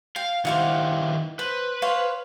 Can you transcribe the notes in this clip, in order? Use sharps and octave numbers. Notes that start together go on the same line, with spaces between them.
F5 G5
D#3 E4 G4 C5 F5 F#5
B4 C5
C5 C#5 F5